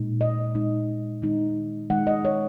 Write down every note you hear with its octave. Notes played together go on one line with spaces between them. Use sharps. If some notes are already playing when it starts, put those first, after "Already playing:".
Already playing: A#2 G#3 D#4
D#5
A#2 G#3 D#4
D#3 G#3 D#4
D#3 G#3 D#4 F#5
D#5
C#5